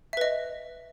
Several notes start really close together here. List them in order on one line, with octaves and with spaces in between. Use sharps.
E5 B4 D#5